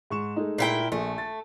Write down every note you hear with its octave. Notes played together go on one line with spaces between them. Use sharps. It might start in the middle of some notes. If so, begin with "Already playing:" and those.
G#2 C#6 E7
G#3 A3 D#4
A#2 E4 G5
A#1 A3
A6